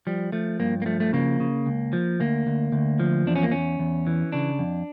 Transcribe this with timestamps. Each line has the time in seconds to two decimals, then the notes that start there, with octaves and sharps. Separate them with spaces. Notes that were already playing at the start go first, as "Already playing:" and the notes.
0.07 F3 G3
0.32 F3 A3
0.60 G2 A#3
0.82 A#3
0.86 F3 A3
1.00 A3
1.13 C#3 A#3
1.40 C#3
1.66 C#2
1.93 F3
2.20 D2 A#3
2.47 D2
2.72 D2
3.00 F3
3.27 E2 D4
3.36 C#4
3.43 A#3
3.52 E2 C#4
3.79 E2
4.07 E3
4.32 C#3 D4
4.59 F2